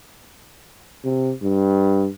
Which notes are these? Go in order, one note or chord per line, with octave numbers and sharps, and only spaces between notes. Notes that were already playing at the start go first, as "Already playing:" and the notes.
C3
G2